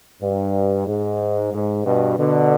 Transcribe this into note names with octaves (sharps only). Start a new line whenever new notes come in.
G2
G#2
G#2
G2 B2
B2 D3